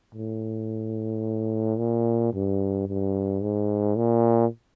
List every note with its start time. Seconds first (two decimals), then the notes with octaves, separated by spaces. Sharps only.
0.15 A2
1.78 A#2
2.34 G2
2.88 G2
3.42 G#2
3.97 A#2